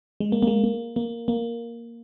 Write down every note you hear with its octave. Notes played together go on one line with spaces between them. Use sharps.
G#3
A#3
A#3
G#3
A#3
A#3
A#3